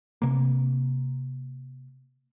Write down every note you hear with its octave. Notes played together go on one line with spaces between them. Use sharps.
C3 A#3